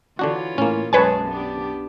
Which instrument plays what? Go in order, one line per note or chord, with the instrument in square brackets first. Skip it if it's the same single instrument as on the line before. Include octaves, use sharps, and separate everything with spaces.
[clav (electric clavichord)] D3 D4 F#4 [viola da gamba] E3 F4 C#5
[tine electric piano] A2 [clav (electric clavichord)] A#3 C#4
[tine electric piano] B1 A5 [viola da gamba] F#2 G#3 G#4 [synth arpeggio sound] B4 C#5 G#5
[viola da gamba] B3 D4 G4